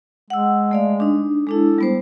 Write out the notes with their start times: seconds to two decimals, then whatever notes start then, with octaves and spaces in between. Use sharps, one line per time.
0.30 G#3 F#5 E6
0.71 A3 D5 F5
1.00 D4 D#4
1.47 G#3 D4 E4 A4
1.78 G3 B3 C5